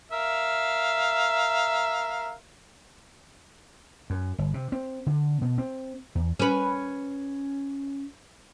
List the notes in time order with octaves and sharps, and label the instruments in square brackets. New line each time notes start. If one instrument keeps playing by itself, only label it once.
[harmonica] A#4 E5 F5
[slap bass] F#2
G1
C3
C4
D3
B2
C4
E2
[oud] C#4 B4